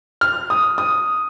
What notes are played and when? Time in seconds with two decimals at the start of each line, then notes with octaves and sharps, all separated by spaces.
0.21 F6
0.50 D#6
0.78 D#6